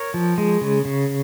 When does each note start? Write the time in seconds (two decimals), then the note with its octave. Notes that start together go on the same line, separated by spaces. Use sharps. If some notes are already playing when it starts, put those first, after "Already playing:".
Already playing: A#4 C#5
0.14 F3
0.38 G#3
0.61 C#3
0.85 C#3